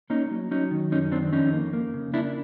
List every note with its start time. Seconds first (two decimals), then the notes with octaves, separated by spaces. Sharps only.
0.10 A#3 C#4 D#4
0.31 F#3
0.51 F#3 C#4 D#4
0.71 D#3
0.91 F#2 C#4 D#4
1.12 D#3 C4 D4
1.32 F2 C#4 D#4
1.53 A#3
1.73 A#3
1.94 C#3
2.14 A#3 D4 E4